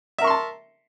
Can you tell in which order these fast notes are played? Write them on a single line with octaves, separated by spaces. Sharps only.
E5 A#4 C#6 C6 A5